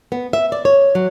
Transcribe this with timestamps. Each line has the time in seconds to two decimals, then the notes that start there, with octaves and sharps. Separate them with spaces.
0.12 B3
0.33 E5
0.52 D5
0.65 C#5
0.95 F#3